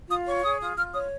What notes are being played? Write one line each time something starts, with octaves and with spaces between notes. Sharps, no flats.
F4 D#6
C#5 C#6
C#6
G#4 D#6
F4 D#6
F4 F6
C#5 D#6